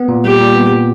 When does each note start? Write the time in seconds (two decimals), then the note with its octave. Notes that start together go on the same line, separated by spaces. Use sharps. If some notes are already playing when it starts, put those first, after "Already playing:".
Already playing: B3
0.08 A#2
0.24 G3 G4
0.40 A#2
0.56 B3
0.72 A#2